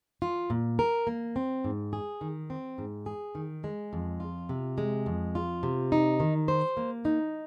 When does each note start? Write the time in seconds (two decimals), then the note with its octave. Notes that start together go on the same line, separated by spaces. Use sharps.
0.22 F4
0.50 A#2
0.79 A#4
1.07 A#3
1.36 C4
1.64 G#2
1.93 G#4
2.21 D#3
2.50 C4
2.78 G#2
3.06 G#4
3.35 D#3
3.64 G#3
3.93 F2
4.20 F4
4.49 C3
4.78 G#3
5.06 F2
5.35 F4
5.63 C3
5.92 D#4
6.20 D#3
6.48 C5
6.77 A#3
7.05 D#4